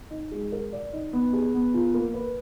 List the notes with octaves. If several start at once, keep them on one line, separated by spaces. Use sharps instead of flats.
D#4
G#3
A#4
D5
D#4
B3
G#4
B3
F4
A#3
B4